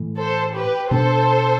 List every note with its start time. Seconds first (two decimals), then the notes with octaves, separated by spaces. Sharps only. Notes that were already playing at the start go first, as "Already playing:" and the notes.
Already playing: A2 E3 A3
0.19 A4 C5
0.55 G4 B4
0.90 B2 B3 D4 A4 C5